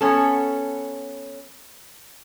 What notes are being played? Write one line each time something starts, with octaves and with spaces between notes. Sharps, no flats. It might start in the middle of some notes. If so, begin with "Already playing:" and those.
B3 C#4 A4